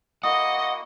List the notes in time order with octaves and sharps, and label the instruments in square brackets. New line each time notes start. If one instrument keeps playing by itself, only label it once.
[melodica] A#3 E4 F#4 [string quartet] D#5 [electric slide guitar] F#5 [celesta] D#6